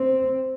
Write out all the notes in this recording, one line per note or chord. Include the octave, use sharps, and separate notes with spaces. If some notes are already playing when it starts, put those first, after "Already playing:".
Already playing: C4